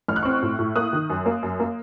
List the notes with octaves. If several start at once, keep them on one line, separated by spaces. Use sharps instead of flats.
A1 F6
F#6
C4 C#6 F6
A2
A2
A#3 D#6 F#6
D#3
F#2
A#3
F#2
A#3